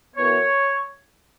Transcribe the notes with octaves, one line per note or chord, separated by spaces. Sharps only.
F#2 E3 B3 C#5